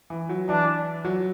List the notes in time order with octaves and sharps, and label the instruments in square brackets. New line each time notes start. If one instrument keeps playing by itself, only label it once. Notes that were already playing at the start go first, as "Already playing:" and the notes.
[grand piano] E3
F#3
[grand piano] E3 [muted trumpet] D4
[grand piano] F#3